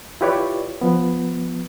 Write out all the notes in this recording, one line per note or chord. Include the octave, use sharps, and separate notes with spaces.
E4 F4 G4 B4 C#5 D5
F3 B3